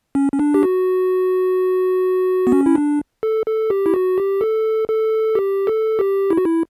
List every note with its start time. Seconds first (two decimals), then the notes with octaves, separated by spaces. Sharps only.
0.15 C#4
0.32 C#4
0.39 D4
0.54 G4
0.63 F#4
2.47 B3
2.52 C#4
2.66 E4
2.75 D4
3.23 A4
3.46 A4
3.70 G4
3.86 E4
3.94 F#4
4.18 G4
4.41 A4
4.89 A4
5.35 G4
5.67 A4
5.99 G4
6.30 E4
6.37 F#4
6.45 E4